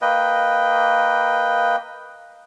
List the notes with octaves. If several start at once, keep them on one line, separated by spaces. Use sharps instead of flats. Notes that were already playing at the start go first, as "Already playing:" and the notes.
A#3 B4 D#5 G5